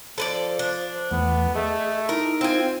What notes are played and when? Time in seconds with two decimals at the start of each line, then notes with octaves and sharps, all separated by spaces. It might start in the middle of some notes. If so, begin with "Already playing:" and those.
0.18 F3 A4 B4 C5 D5
0.59 D4
1.11 E2 E3 A3 B3
1.55 A3 G#4 D#5
2.09 D#4 E4 A#4
2.41 C4 F4 G#5